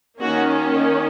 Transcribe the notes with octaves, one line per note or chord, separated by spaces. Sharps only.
D#3 A#3 C#4 F#4